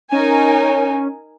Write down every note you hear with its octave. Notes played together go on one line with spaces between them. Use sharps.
C#4 D#4 A#4 G#5